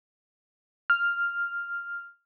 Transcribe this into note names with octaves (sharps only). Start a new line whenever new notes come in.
F6